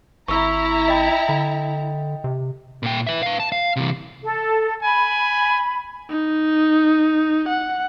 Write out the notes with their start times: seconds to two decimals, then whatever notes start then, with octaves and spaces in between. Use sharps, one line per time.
0.28 G#1 E4 A#5 C#6 E6
0.88 D#5 G5
1.29 D3
2.24 C3
2.83 A#2 G5
3.07 B4 E5
3.23 B4 F5
3.40 A5
3.52 F5
3.76 C3 E3
4.23 A4
4.83 G#5 B5
6.10 D#4
7.49 F#5